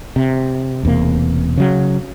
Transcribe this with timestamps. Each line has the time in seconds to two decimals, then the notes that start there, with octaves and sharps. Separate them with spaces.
0.16 C3
0.83 E1 E2 C3 A#3
1.58 C#3 F#3